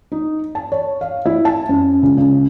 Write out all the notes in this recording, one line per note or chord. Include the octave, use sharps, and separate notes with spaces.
D#4
A5
C#5
F5
E4
A5
F#2
C#2
C#2